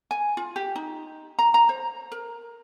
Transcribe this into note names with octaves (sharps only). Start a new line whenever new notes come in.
G#5
F4
G4
D#4
A#5
A#5
C5
A#4